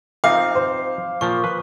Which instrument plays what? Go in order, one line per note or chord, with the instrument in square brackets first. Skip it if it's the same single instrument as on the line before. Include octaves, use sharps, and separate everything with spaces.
[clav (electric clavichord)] F3 C4 D#4 [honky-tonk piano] F5 [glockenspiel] D6
[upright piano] C5
[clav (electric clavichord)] A#2 F3 [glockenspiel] C#6
[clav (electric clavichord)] B4